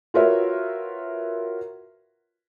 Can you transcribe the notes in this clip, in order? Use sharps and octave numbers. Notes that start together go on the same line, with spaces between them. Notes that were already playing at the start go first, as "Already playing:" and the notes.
F4 F#4 A#4 B4 C#5 E5